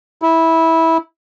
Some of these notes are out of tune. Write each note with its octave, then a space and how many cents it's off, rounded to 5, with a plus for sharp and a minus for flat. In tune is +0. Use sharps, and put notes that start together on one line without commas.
E4 -15